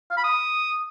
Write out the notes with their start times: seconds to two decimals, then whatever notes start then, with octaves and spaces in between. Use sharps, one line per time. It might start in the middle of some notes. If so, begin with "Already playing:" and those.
0.11 F5
0.17 B5
0.24 D#6